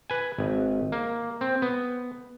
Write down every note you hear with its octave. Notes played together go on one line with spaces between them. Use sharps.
B4 G#5
G#1
A#3
C4
B3